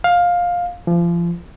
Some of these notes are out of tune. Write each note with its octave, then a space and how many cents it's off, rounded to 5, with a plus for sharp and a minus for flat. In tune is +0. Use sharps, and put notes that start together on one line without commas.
F5 +15
F3 -30